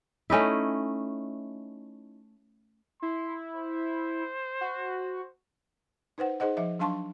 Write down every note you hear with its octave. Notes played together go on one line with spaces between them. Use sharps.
A3 C#4 D#4 E4
E4 C6
C5
F#4
D#4 B4 C5 F#5
D#4 G#4 C5 D#5 F#5
F3 D#5 E5
F#3 D4 F5 A5 C6 C#6